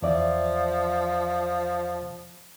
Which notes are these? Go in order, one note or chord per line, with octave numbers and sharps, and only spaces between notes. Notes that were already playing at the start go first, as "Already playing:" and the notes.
E2 F3 D5 E5